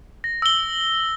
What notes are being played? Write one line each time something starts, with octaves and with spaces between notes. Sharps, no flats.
A#6
E6 G7